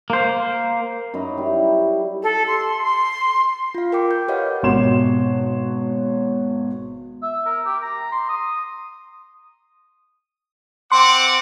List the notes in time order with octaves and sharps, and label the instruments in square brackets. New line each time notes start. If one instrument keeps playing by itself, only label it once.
[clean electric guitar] A#3 C5
[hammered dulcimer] F#2 D#4 B4 A#5
G3 E4 G4
[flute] A4
C6
C6
[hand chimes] F4 F5
A#4 G5 D6
G6
G4 B4 C#5 D#5 F5 F#5
[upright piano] G#1 B2 F#4 C#5 C6 E7
[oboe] E5
A#4
G4
A#5
C6
D#6
[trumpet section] C4 F#5 D6 [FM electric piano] C6